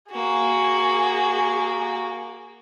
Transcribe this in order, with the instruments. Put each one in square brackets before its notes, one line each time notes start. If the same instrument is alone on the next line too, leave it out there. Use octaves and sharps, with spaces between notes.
[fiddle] A#3 F#4 [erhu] G#4